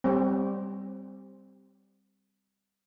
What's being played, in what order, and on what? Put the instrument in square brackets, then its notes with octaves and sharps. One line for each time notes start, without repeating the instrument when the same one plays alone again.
[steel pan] G3 C4